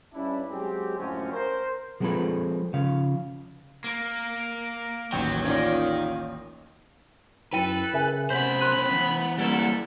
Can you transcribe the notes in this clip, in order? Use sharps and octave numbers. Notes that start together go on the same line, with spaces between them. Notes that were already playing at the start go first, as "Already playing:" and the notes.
G2 C#4 D4 E4
F#3 G#3 C4 G4
F#2 A2 D3 F3 C4 C#4
A#4 C5
F3 G#3 B3 C4 A4 B4
C#3 F3 F5
A#3
A1 D#2 F#3 G5
D#3 C#4 F4 D5
F#2 E4 A4 B4 G5 D#7
C#3 A#4 E5 G#5
C3 B3 C5 B5 G6
C6 F#6 D#7
E3
G3 A#3 E4 A4